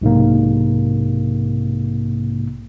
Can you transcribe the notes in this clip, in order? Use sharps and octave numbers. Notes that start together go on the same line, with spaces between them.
B1 G#2 C3 A#3